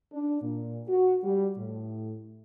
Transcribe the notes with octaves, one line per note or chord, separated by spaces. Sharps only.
D4
A#2
F#4
G3
A2